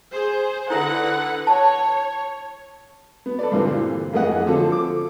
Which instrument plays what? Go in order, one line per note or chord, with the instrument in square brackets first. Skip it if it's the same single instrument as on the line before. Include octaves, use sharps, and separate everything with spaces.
[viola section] G#4 C5
[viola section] D3 B4 F#5 [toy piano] E4 A4 E5
[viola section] C#5 [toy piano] A5
[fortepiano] B3
A4 B4 D5
G2 A#2 D3 E3 A#3 C4
A1 F2 A#3 G#4 D#5 F#5
D3 F3 F#3 C4 F4 A4
D6